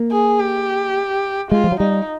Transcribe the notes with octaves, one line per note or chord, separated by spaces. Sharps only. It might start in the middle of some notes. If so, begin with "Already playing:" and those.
Already playing: A#3
G#4
G4
G#3 F4
F3
F#3
G3 D#4